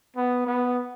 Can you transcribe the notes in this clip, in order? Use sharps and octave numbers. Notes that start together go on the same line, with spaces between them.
B3
B3